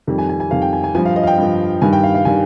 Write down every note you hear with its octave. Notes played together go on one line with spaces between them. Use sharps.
F2 D#3 G3
G#5
G#5
G#5
F2 D#3 G3 F5
G5
G#5
G#5
G2 F3 G#5
F5
D#5
F5
G5
G2 F3
G2 D#3 G3 G#5
G5
F5
F5
D#3 G3 G#5